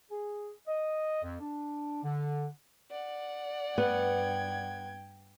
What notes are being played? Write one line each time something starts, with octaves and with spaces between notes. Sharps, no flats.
G#4
D#5
F2
D4
D3
D5 F#5
G2 B3 G5 G#6